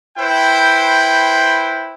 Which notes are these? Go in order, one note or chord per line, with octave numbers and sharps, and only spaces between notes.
E4 B4 C5 G5